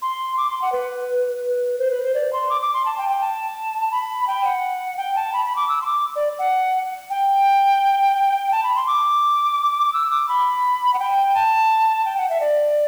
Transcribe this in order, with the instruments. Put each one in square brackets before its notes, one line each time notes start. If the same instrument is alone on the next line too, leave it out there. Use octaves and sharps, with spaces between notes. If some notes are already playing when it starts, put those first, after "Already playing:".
[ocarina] C6
D6
C6
F#5
B4
C5
B4
C5
D5
C6
D6
D6
C6
A5
G5
G5
A5
B5
G5
F#5
G5
A5
B5
B5
D6
E6
C6
D6
D5
F#5
G5
A5
B5
C6
D6
E6
D6
B5
F#5
G5
A5
G5
F#5
E5
D5